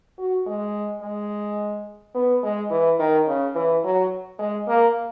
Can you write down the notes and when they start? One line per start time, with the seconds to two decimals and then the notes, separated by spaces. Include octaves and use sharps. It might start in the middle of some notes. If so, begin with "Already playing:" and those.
0.18 F#4
0.46 G#3
1.02 G#3
2.14 B3
2.43 G#3
2.70 E3
2.99 D#3
3.27 C#3
3.55 E3
3.84 F#3
4.39 G#3
4.68 A#3